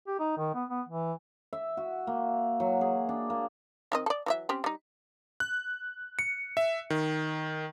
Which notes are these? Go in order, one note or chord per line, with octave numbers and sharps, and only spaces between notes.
G4
D#4
D#3
B3
B3
E3
E5
F#4
A#3
F#3
G#4
D4
A#3
D#3 C4 D#5
A4 D5
E3 F#3 E5
C4 C#4 G4
G3 D#4
F#6
C#7
E5
D#3